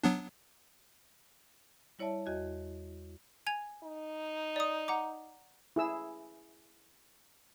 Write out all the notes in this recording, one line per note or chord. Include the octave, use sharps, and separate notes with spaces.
F#3 B3 D4
G3 E4 C#5 D5 E5 A5
E2 F#4 D#5 G6 G#6
G#5 G#6 F7
D#4
D5 D#6
F#5 A#5 D6
E4 G#4 E6